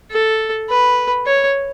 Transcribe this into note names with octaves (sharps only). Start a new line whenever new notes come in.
A4
B4
C#5